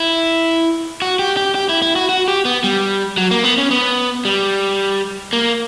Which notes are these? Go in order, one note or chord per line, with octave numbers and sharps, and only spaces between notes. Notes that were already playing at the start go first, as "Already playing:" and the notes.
Already playing: E4
F#4
G4
G4
G4
E4
E4
F#4
F#4
G4
B3
G3
F#3
A#3
B3
C#4
B3
G3
A#3